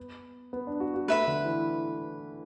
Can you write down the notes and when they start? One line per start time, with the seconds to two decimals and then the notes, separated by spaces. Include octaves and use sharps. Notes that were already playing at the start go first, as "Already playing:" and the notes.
Already playing: B3
0.53 B3
0.67 D4
0.80 F#4
0.94 F#4
1.08 A3 B4 E5 B5
1.27 D3
1.44 E3